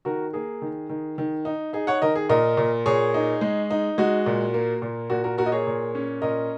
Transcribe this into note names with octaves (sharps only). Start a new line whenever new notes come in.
D#3 F#4 A#4
A#3 G#4
D#3
D#3
D#3
D#4
D#4 G#4
C#5 F#5
D#3 A#4 D#5
G#4
A#2 A#4 D#5
A#2
A#2 G#4 C#5
D#4
G#3
D#4
G#3 F#4
A#2
A#3
A#2
A#2 F#4
F#4 A#4
A#3 F#4 A#4
D#5
G#4 C#5
A#2
C#4
A#2 A#4 D#5